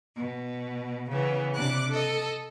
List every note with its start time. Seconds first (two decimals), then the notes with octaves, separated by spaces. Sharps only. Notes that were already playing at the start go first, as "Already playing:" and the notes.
0.16 B2
1.09 C#3 E3 B3
1.55 C3 D4 D6 F#6
1.89 A4 D#5